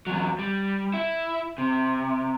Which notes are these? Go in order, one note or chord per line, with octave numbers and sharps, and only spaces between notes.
E2 F#3
G3
E4
C3